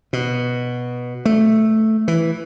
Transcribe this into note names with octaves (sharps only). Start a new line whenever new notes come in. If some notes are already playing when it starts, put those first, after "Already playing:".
B2
A3
E3